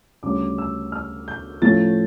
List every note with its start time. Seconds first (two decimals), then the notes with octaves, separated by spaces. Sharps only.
0.23 D2 C#3 G3 C#4 D6
0.58 E6
0.92 F6
1.28 G6
1.62 A2 F3 A3 C#4 A6